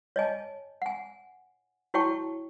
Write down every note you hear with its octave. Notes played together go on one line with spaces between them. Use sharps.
C#5 D#5 G#5 A5
F#5 G#5
E4 F#4 C#5 G5 A5 C#6